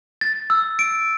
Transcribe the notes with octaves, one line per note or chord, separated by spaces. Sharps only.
A6
E6
D7